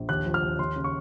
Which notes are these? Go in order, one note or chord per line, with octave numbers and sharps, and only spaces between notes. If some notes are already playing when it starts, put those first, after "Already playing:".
Already playing: A#1
D#2 F#6
F3
F6
D#2
D#2 C6
C#3
C#6